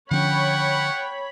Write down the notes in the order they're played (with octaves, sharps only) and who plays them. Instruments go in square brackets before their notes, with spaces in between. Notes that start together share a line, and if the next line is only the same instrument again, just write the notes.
[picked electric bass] D3 F3 C#4 [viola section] C#5 B5 [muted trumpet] F#5 [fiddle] G5 C#6